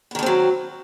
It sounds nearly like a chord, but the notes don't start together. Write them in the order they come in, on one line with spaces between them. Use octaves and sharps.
B3 D#3 D3 C4 F#3